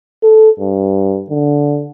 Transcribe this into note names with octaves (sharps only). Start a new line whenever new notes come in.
A4
G2
D3